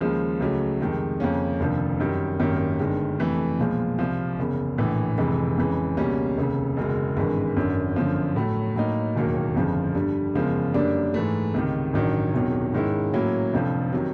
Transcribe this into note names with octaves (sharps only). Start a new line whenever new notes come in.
D#2 C#3 F3 G#3
C#2 C#3 F#3 A3
F2 C3 D#3 G#3
F2 C#3 F3 A#3 C#4
F1 D#2 D3 F3
F#2 D#3 G3
G#1 F#2 D#3 G3 A#3
G1 G2 D#3 G#3
F2 C3 E3 A3
B1 A#2 F3 G#3
C2 C3 F3
F#1 E2 C#3
A#1 A2 E3
F1 F2 C3 E3 G#3
F2 C#3 E3 G#3
C#2 B2 G3 A#3 C#4
F1 D#2 C#3
F#1 E2 B2 G#3
G#1 G2 E3 G#3
G#1 F#2 D3
G1 F#2 D3 F3
A2 F#3 A3
A2 F#3 A#3 D#4
E1 D#2 D#3 F#3 A#3
G1 F2 C#3 F3
G2 D3 G3
F#1 E2 C#3 F3 G#3
F#2 D3 G3 A#3 D4
G#2 E3 A3
C#2 C3 D#3
A1 G2 D#3 F#3
E1 E2 C3 D#3 F#3
G#2 D#3 G#3 C#4 E4
A2 F#3 A#3 C#4 E4
F1 F2 D3 F3
C3 D#3 F#3